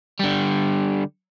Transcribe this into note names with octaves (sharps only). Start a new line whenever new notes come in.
D3 G3